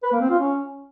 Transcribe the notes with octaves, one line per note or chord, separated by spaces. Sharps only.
B4
A#3
C4
F4
C#4